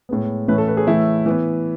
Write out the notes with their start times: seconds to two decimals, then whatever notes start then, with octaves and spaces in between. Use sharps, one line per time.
0.09 A2 G#3 B3
0.48 A2 E3 A3 C#4 B4
0.58 A4
0.68 B4
0.77 G#4
0.87 A2 E3 A3 E4
1.26 E3 B3